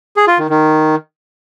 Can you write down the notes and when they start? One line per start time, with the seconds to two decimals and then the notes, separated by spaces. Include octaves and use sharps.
0.16 G#4
0.27 F4
0.39 D#3
0.50 D#3